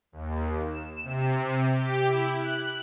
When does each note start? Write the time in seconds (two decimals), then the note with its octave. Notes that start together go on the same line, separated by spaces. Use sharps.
0.12 D#2
0.70 E7
1.03 C3
1.73 G4
2.05 E4
2.37 F#6